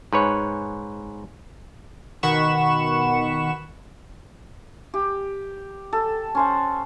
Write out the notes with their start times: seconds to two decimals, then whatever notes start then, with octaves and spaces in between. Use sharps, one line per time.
0.13 G#2 B4 C#5
2.23 B2 D#3 F#5 B5 C#6 E7
4.94 G4
5.93 A4
6.35 C#4 C5 F#5